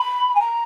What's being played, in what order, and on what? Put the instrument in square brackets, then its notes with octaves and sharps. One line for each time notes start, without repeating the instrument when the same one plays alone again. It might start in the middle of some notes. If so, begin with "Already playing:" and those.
Already playing: [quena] B5
G#5
A#5